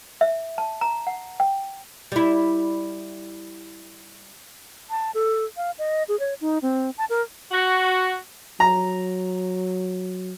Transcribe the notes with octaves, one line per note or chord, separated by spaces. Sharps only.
E5
A5
A#5
F#5
G5
G3 E4
A5
A4
F5
D#5
G#4
C#5
D#4
C4
A5
A#4
F#4
F#3 A#5